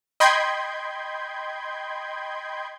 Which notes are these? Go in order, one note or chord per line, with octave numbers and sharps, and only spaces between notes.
D#5 G5 B5 C6 G6 G#6